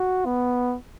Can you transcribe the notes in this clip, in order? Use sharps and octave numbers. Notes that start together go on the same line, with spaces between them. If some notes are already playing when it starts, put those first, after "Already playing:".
Already playing: F#4
B3